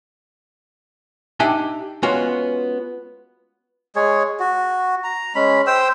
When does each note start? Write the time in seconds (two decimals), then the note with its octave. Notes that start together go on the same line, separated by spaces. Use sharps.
1.40 D4 D#4 G4 E5 G#5
2.03 G#3 B3 C#4 F4 F#4
3.96 G#3 G#4 C#5
4.40 F#4
5.04 A#5
5.35 G#3 C#4 B5
5.67 C5 G5 E6